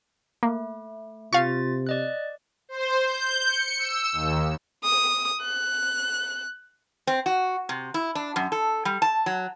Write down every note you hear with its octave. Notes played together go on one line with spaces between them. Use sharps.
A3 A#3
C3 F4 F5 C#6 A6
D5 D#5 F#6
C5
G6
C#7
E6
D#2
D#6
F#6
C4
F#4
C3
E4
D4
F#2
A4
G3
A5
F#3